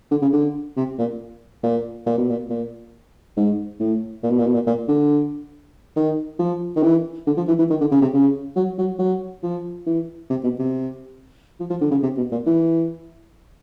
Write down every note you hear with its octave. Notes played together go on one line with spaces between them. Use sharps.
D3
C#3
D3
C3
A#2
A#2
A#2
B2
A#2
A#2
G#2
A2
A#2
B2
A#2
B2
A#2
A#2
D3
D#3
F3
D#3
E3
D3
F3
E3
E3
D#3
D3
C#3
C3
C#3
F#3
F#3
F#3
F3
E3
C3
B2
C3
F3
F3
D3
C#3
C3
B2
A#2
E3